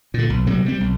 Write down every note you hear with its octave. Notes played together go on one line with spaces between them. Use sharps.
A#2 D3
B1
C3 F#3 G3
G3 C4
B1